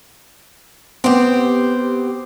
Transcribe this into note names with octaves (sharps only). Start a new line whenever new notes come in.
B3 C4 G4